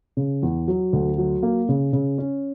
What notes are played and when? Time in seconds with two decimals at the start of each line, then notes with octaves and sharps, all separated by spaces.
0.17 C#3
0.43 E2
0.68 F#3
0.93 D2
1.18 F#3
1.43 A#3
1.69 C#3
1.93 C#3
2.18 C#4